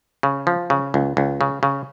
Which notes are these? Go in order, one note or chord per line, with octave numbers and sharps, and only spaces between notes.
C#3
F3
C#3
C#2
C#2
C#3
C#3